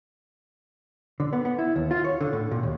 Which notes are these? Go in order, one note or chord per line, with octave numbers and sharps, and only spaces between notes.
D3
B3
B3
E4
D#2
F4
C#5
D3
A2
A#2
D#2